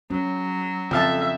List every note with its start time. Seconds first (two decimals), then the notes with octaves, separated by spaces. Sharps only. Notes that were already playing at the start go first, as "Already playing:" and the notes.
0.10 F#3 C#4
0.91 F2 C#3 A4 E5 F5 A5